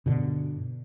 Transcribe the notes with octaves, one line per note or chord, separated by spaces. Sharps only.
G2 B2 D3